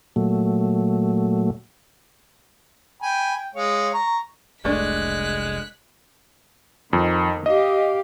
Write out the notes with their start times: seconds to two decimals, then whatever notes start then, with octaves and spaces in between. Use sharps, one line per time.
0.16 A#2 F#3 A3
3.03 G5 G#5 B5
3.36 G5
3.55 G#3 C#5 F5
3.94 A#5 C#6
4.65 F1 C2 G#3 A3 D4 F#6 B6
6.93 F2 D#3
7.46 G4 D#5 F5